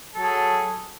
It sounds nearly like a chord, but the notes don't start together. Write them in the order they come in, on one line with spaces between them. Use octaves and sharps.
A4 F#3 G#4